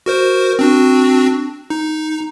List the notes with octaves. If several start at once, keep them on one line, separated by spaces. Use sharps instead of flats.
F#4 A#4 C5
C4 D4 F#4
D#4